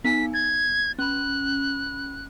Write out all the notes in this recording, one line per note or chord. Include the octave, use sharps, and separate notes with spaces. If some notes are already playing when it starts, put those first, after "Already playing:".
B3 D#4 G#5 B6
G#6 A6
C#4 B5 F#6